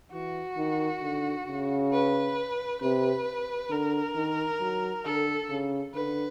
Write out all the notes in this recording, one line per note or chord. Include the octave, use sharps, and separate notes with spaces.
E3 F#4
D#3
D3
C#3
B4
C3 B4
D3 A#4
D#3
F#3
D3 A4
C#3
D3 B4